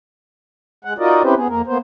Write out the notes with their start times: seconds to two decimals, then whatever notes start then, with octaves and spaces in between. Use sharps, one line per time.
0.85 G#3 F#5
0.98 D#4 F4 F#4 A#4 D5 D#5
1.23 C4 C#4 E4 G4 B4 C5
1.35 B3 G#4
1.49 F2 A#3 A#4
1.67 A#3 B3 C5